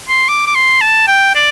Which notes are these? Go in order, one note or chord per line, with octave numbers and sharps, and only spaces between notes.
C6
D6
D6
C6
A5
G5
D5